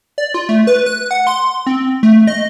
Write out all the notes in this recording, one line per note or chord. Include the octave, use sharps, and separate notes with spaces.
D5
F4
A3
B4
F#6
F#5
C6
C4
A3
D#5